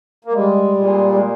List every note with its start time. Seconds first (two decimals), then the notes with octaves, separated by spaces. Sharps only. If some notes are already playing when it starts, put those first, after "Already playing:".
0.25 A#3
0.32 G3 G#3
0.77 A#2 G#3
1.12 G#3